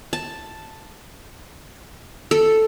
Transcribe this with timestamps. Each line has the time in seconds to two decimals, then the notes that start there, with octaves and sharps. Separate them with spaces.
0.13 A5
2.31 A4